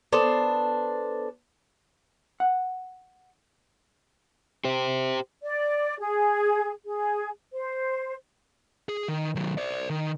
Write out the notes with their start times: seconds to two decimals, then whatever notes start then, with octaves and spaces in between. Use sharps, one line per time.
0.12 B3 D4 A4 C5
2.40 F#5
4.64 G4 C5
5.43 D5
5.99 G#4
6.86 G#4
7.53 C5
8.89 G#4
9.08 D#3
9.35 D#3 F#3
9.58 C5 D5
9.90 D#3